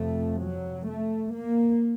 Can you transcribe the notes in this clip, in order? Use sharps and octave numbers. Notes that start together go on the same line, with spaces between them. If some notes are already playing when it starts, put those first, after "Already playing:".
Already playing: F2 C3 A3
F#3
A3
A#3